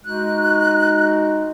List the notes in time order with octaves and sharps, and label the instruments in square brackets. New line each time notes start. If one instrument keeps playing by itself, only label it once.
[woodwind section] G#3 D#4 F#4 [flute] F#6